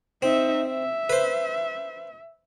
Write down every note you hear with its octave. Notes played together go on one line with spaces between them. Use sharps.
C4 D#4 E5
E5
B4 C5